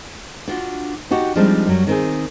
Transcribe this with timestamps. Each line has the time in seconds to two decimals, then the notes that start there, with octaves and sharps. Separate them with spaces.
0.48 D4 F4 F#4
1.11 D4 D#4 F#4 G4
1.36 F3 G3 G#3 C4 D4 D#4
1.67 F#2 F#3 G3
1.87 D#3 C4 G#4